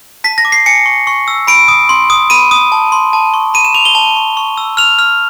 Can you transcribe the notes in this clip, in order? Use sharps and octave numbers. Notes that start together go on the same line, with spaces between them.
A5 B6
A#6
D6
C7
G#5 C#7
C#6
C#6
E6
B5 D7
D#6
C6
D#6
B5 D#7
D#6
A5
C6
A5
C#6
B5 D#7
E7
D6 F7
G7
A5
C#6
C#6
E6
F6 F7
F6